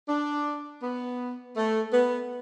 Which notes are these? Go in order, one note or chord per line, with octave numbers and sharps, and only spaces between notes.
D4
B3
A3
B3